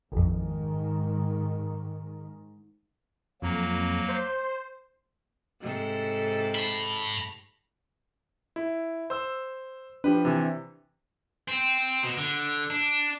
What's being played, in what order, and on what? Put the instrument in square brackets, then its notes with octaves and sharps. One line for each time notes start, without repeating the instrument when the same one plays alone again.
[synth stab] A1 F2 [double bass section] G#2 D#3
[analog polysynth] F2 [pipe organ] F#3 A#3
[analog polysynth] C5
[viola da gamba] G#2 C3 A4
[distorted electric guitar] A5 B5
[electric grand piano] E4
C5 E6
[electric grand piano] F3 G4 B4 [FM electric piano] D4
[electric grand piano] C3 E3
[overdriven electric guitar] C4
B2
D3
D4